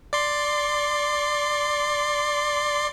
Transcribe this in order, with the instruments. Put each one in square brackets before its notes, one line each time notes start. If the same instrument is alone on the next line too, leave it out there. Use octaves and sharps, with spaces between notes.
[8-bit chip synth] D5 C6